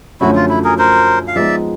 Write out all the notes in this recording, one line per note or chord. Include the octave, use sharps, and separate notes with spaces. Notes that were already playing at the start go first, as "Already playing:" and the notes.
F#2 D3 F3 A3 C#4 E4 F#4
F4
E4
G#4 A#4
A#4 C5
F5
F3 G#3 B3 D#4 D5 E5